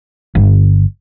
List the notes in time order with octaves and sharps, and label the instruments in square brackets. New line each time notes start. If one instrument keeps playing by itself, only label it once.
[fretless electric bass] G1